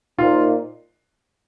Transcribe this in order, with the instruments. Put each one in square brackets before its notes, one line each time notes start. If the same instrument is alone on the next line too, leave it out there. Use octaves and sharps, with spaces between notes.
[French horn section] A#2 A#3 D#4 C5 [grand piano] F4